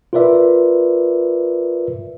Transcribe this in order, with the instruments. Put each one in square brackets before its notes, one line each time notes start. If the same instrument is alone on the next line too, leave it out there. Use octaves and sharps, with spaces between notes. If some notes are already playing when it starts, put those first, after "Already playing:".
[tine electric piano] F4 A#4 B4 D5 E5